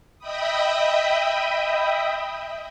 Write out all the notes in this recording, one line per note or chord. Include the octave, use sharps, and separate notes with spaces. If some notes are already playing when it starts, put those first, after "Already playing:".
D#5 E5 G5 B5 D#6